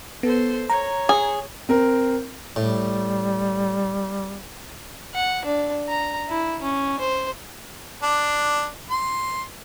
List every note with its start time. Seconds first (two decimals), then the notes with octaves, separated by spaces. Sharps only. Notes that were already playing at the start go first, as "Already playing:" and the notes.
0.23 B3 A4 C5
0.70 C#5 A#5
1.09 G#4
1.69 C4 A#4
2.56 A2 G3
5.14 F#5
5.45 D4
5.88 A#5
6.29 E4
6.62 C#4
6.99 C5
8.03 D4
8.90 C6